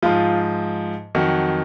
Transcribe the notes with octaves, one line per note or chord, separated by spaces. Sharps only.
G#2 F3 F4
F2 D#3 F#3 F#4